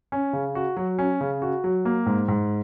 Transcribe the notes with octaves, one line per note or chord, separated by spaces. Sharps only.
C#4
C#3
F#4
F#3
C#4
C#3
F#4
F#3
A#3
G#2
G#2